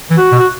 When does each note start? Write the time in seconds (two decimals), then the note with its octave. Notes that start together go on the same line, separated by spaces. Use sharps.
0.10 E3
0.17 F#4
0.32 B2
0.39 F#4